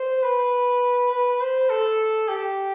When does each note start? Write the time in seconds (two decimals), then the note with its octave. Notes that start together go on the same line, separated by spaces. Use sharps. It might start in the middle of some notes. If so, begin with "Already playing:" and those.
Already playing: C5
0.23 B4
1.11 B4
1.41 C5
1.70 A4
2.28 G4